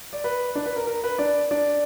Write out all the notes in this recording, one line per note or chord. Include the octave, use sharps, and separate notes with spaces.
D5
B4
D4 D5
B4
A#4
A#4
B4
D4 D5
D4 D5